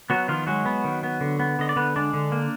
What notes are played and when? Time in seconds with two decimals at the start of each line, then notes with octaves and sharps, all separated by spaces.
0.10 F#3 B3 F#4
0.28 D#3 F3 F4
0.47 F#3 G#3 F#4
0.66 B3
0.84 D#3
1.03 B3
1.21 D3
1.40 B3
1.59 D3 D#5
1.69 D5
1.76 D3 B3 B4
1.96 G#3 D4 D5
2.13 D3
2.32 A#3